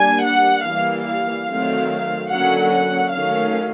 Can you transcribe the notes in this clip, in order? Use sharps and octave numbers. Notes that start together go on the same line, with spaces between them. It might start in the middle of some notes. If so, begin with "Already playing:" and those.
Already playing: G3 A#3 D4 G#5
F#5
E3 G3 A#3 F5
F5
D#3 F#3 A3 C4
D3 F#3 A#3 C#4 F#5
F#5
D#3 F#3 A3 C#4 F5